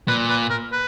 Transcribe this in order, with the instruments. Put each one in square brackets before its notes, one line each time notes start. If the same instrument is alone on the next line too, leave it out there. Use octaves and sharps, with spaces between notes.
[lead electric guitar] A#2 [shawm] B4
[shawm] B4
A#4
B4